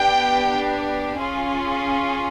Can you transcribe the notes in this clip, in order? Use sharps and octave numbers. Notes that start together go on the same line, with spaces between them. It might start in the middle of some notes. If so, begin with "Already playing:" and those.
Already playing: B3 D4 G4 G5
C#4 F4 G#4